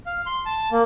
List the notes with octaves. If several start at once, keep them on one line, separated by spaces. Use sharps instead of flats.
F5
C6
A5
A#3